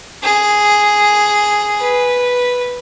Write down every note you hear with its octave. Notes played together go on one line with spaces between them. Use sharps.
G#4
B4